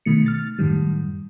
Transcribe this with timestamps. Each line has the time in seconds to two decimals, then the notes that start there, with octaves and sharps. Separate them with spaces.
0.05 B2 D#3 A3 C#7
0.26 F6 A6
0.59 F#2 A2 D#3 G3